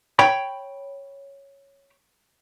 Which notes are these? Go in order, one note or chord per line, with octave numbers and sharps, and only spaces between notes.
C#5 G5 B5